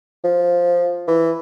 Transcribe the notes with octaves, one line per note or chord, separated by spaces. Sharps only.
F3
E3